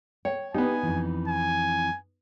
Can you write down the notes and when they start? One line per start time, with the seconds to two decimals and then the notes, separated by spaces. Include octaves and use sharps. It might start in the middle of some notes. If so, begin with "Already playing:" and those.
0.25 C#5 G5
0.54 B3 D4 D#4 G4 G#5
0.83 F2 E3
1.28 G#5